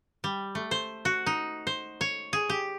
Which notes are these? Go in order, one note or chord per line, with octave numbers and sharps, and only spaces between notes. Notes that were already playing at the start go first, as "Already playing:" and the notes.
G3
A3
C5
F#4
D#4
C5
C#5
G#4
G4